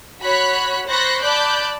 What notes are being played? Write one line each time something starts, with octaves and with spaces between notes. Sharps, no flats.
F#4 C#5 B5 F#6 B6
C5 B5 C#6 F#6 A6 A#6
D5 A5 B5 D6 F#6 G6